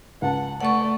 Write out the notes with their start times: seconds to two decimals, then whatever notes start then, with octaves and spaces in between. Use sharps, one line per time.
0.22 C#2 F#5 A5
0.60 A3 D5 F#5 C#6